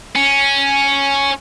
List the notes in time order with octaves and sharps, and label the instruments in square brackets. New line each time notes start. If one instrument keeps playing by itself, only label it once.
[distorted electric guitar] C#4